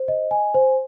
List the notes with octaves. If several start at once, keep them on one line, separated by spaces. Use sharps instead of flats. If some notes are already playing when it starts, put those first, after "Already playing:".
Already playing: C5
D#5
G#5
C5